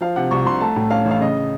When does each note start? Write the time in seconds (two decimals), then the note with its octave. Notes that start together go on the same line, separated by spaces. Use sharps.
0.01 F3 F5
0.16 C3 F#5
0.31 C2 C#6
0.46 C2 C6
0.60 A3 A5
0.76 A2
0.90 C#4 F5
1.05 A1
1.11 F5
1.20 C#3 D#5